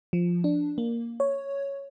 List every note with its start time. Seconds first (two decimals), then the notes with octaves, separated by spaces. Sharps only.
0.13 F3
0.44 D4
0.78 A#3
1.20 C#5